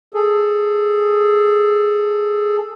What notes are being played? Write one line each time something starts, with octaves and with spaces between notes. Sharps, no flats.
G#4 A4